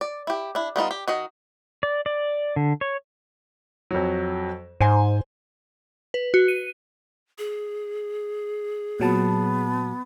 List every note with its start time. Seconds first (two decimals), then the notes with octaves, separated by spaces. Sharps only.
0.01 D5
0.27 E4 G4
0.55 D4 E4
0.76 G3 B3 D#4 F4
0.91 G4
1.08 D#3 F#4 D#5
1.83 D5
2.06 D5
2.56 D3
2.81 C#5
3.91 F2 F#3
4.80 G#2 C5 G#5
6.14 B4
6.34 F#4
6.48 D#7
7.38 G#4
9.00 A#2 F#3 B3 A5